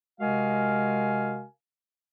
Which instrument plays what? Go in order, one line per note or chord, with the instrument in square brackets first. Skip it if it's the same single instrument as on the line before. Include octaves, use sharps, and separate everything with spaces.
[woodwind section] C3 G#3 F#4 A#4 F5 G#5